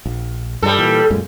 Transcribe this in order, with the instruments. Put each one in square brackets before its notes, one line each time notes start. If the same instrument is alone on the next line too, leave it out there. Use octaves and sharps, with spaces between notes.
[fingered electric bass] A#1
[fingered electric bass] G2 [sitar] G3 A4
[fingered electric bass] A#2 E3
F#2 A#2 G#3